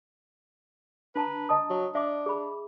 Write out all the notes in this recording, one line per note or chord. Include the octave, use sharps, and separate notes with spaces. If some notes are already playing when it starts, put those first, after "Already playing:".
D4 B4 A5 A#5
D#5 A5 D#6
F#3
D4 E5 D6
G#4 B5